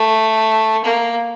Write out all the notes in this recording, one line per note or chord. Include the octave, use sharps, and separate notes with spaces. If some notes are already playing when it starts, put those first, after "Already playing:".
Already playing: A3
A#3